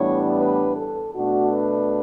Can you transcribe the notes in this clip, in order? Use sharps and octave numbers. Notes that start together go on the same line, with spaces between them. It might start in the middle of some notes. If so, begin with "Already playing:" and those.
Already playing: A2 E3 G3 B3 D4 C#5
B4
A4
B2 A3 D4 F#4
B4